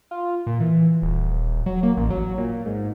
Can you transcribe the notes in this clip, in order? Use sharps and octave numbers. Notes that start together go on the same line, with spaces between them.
F4
A#2
E3
D#1
F#3
A#3
A1
F#3
A#2
G#2